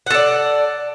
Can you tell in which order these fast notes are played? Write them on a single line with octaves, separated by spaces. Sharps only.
F#5 A4 D5